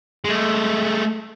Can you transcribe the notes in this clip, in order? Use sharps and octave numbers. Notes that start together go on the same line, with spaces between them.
G#3 A3